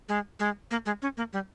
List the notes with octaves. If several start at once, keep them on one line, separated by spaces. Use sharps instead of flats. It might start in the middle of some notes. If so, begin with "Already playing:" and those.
G#3
G#3
A#3
G#3
C#4
A#3
G3